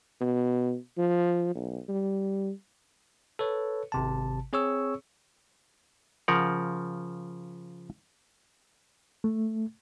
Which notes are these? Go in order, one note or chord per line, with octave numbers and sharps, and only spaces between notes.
B2
F3
B1
G3
A4 B4 C#5
G#1 C3 A5
C4 G#4 C#5 C#6 E6
C#3 F3 A#4 F#5
A3